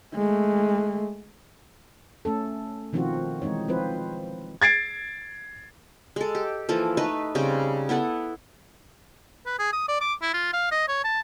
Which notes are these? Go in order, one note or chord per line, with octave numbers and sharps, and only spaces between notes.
G#3 A3
A3 C#4 A4
B2 D#3 F3 C4 F4 F#4
E3 G#3 C4 D#4 C#5
F3 C4 F4 B4 C5
G#6 A6 C7 D7
G#3 A4
G4
E3 F3 A#3 A4
A3 D#4 B4
C#3 G3 C4 G5
B3 E4 A4 F#5
B4
G#4
D#6
D5
D6
E4
F4
F5
D#5
C#5
A5